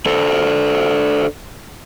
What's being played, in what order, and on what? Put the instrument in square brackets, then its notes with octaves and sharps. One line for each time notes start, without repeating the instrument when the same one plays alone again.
[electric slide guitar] D4 A4 C5